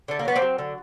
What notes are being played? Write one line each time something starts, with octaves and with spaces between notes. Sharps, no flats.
D3 A3
A#3
F#3 B3
A#3 C4
F#3
D3